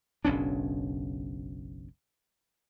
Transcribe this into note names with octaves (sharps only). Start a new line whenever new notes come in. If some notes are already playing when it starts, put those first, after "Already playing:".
F#1 B1 C#4 D4